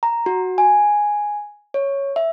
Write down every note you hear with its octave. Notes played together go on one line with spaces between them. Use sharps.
A#5
F#4
G#5
C#5
E5